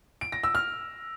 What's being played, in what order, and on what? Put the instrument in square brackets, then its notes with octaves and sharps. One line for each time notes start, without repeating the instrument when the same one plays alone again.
[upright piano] D7
A#6
E6
F6